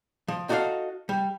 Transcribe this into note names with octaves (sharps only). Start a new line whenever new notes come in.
F3
D#4 F#4 A4 D5 F5
G3